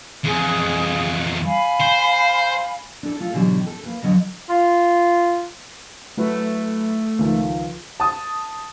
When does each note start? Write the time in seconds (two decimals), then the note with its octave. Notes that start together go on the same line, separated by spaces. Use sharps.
0.24 F2 E3 G#4
1.44 F5 G#5 B5
1.80 C5
3.03 D4 E4 A4
3.20 A3 F4
3.33 G#2 B2 D3 E3 F#3 G4
3.66 A4
3.83 A#3 B4
4.02 F2 D3 F#3 D#5 F#5
4.49 F4
6.18 F#3 A3 E4 B4
7.19 C#2 D#3 F3
8.00 A5 D#6